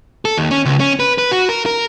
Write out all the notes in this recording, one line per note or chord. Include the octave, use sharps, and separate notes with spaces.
A4
D#2
C#4
C#2
C#4
B4
B4
F#4
A#4
A#4